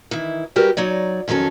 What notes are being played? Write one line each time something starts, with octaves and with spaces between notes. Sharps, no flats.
D#3 E3 E4
G3 G#3 F#4 G4 A#4 B4
F#3 D#4 C#5 D5
F2 D#3 F#3 C#4 A4